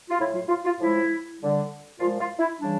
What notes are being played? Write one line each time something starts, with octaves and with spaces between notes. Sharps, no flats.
F4
A2 F#3 E4
F4
F4
F4
A2 F3 G#3 E4
D3 G3
A#2 F3 G#3 F4
F4
E4
C#3 E3 G3 D4